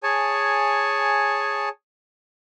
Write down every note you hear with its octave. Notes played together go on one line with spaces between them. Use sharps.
G#4 C#5 G#5 A5